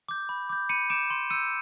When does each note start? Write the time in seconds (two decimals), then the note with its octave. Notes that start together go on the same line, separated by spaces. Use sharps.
0.09 D6 G6
0.29 B5
0.49 D6 G6
0.69 B5 C#7 D#7
0.90 D6 G6 D7 E7
1.10 C6
1.30 E6 G6 C#7 D#7